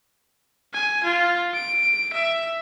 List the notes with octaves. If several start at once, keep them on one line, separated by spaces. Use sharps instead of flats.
G#5
F4
D7
E5